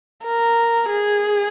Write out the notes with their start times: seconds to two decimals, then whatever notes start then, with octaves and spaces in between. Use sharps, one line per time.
0.24 A#4
0.89 G#4